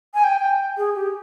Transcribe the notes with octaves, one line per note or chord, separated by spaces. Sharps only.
G#5
G5
G5
G#4
G4